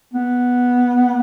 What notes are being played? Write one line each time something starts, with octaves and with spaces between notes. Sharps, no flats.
B3